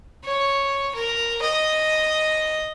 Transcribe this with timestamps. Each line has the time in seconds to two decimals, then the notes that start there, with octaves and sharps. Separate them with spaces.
0.24 C#5
0.95 A#4
1.42 D#5